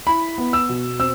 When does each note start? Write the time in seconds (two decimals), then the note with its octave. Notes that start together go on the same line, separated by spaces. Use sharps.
0.07 E4 B5
0.38 B3
0.53 E6
0.69 B2
0.99 C4 E6